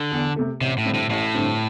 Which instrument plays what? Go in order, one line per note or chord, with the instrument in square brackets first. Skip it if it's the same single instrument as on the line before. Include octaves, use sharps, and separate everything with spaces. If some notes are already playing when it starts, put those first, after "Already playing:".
Already playing: [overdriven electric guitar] D3
[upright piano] E2
C3 A3
[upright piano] A1 [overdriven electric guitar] C3
[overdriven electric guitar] A2
[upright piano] G2 D3 C4
[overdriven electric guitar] A2
[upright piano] A1 [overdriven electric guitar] A2
[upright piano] G2 D3 C4